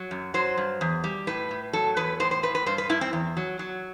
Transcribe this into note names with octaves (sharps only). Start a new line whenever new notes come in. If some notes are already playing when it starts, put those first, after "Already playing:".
Already playing: F#3
F#2
F#3 C5
G2
E2
G3
A2 B4
A2
F#3 A4
E2 B4
A2 C5
C5
A2 B4
B4
G2 C5
B4
G2 E4
C4
E2
F#3
F#3